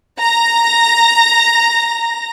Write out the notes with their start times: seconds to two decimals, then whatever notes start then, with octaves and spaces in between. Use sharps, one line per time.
0.20 A#5 A#6